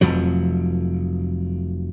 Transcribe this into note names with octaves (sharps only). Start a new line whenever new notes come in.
F1 F2 F3 F#3